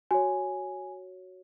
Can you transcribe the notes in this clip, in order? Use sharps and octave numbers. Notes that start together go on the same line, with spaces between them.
F#4 C#5 G#5